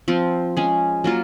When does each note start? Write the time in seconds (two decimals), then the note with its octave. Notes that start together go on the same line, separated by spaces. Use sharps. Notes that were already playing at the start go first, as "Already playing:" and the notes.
0.08 F3 C4 F4
0.57 G#3 C#4 G#4
1.04 F#3 A#3 F4